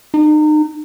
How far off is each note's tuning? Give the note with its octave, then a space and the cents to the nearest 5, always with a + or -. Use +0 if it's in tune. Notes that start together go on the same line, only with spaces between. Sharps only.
D#4 -35